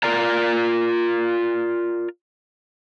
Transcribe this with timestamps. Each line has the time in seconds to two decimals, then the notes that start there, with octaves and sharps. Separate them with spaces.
0.03 F4 A#4 D5 A#5